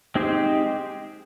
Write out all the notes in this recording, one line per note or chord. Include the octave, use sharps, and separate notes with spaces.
G#3 C4 D#4 G4 C5